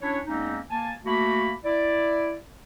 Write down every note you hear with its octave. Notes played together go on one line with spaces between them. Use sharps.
C#4 D4 E4 C#5
E2 G#3 A#3 C4 C#4 D#4
A#3 G#5 A5
A3 A#3 F#4 B5
E4 D5